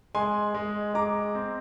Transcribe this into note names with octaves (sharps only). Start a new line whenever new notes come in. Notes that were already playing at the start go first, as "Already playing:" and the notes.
G#3 G#5 C6
G#3
G#3 A#5 D6
C4